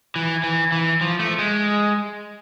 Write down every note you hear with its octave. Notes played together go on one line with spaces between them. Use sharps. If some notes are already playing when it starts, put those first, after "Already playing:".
E3
E3
E3
F3
A3
G#3